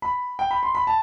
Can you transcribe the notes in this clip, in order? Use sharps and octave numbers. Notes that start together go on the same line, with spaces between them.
B5
G5
B5
C6
B5
A5